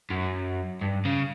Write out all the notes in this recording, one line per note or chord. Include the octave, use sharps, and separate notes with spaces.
F#2
G2
C#3